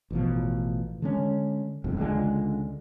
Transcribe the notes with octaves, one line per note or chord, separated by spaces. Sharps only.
A1 B2 F3
D3 G#3 C#4
G1 C2 F2
C#2 D3 G#3